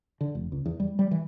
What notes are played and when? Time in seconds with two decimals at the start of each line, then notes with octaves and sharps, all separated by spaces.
0.21 D3
0.35 F1
0.52 C#2
0.66 E2
0.80 G3
0.99 G3
1.11 E3